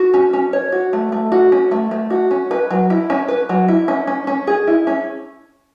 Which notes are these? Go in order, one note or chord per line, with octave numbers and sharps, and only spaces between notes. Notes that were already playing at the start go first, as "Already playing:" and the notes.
Already playing: F#4
C#4
C#4
C#5
F#4
A3
A3
F#4
C#4
A3
A3
F#4
C#4
B4
F#3
E4
C#4
B4
F#3
E4
C#4
C#4
C#4
G#4
E4
C#4